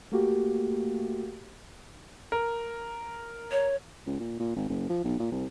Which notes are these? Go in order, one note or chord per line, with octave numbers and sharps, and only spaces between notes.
A3 A#3 F#4 G4
A#4
C#5
C#2
A#2
A#2
G#1
F#1
F3
B1
A#2
C2